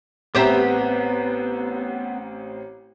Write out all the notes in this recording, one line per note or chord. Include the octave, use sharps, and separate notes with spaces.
A1 B3 C4 G4 C5 E5 A#5